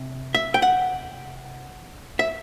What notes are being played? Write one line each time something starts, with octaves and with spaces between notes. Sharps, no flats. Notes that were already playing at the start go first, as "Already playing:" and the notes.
Already playing: C3
E5
G5
F#5
E5